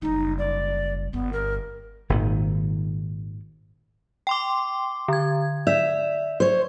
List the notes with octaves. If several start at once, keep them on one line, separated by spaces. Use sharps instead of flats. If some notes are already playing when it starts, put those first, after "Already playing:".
F#1 G3 D#4
D5
G1 G2 B3
A#4
G#1 A#2 D#3
G5 C6 D6
D3 G#6
D5 E5
C5 C#5